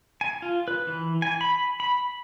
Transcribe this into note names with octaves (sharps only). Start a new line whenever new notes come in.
G#5
F4
B4
E3
G#5
B5
B5